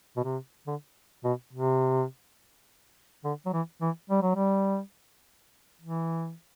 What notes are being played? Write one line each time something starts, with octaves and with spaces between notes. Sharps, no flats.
B2
C3
D3
B2
C3
D3
F#3
E3
E3
G3
F#3
G3
E3